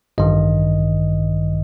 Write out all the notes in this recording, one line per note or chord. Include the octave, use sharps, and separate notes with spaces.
A1 G2 D#3 D#5